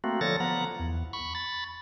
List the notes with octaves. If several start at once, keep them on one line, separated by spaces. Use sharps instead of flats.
A3 A#3 C4 F#4
D3 F3 A4 C#5 A6 A#6
F3 B3 F#5 A#5
E2
B5 C#6
B5 A6